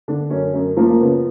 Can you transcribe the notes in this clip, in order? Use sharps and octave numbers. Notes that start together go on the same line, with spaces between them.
D3 D4
F#2 C#4
F#2
F3 A#3
A#3
C#3 B3